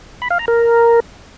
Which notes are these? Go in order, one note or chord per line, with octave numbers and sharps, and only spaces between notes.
B5
F5
A#5
A#4